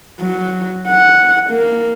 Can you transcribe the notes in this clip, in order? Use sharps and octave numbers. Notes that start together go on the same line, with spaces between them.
F#3
F#5
A#3